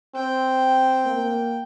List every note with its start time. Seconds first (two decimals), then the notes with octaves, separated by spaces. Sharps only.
0.15 C4 G5
1.06 A#3